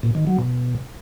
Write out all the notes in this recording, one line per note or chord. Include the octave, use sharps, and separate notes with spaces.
A#2
D#3
F#3
B2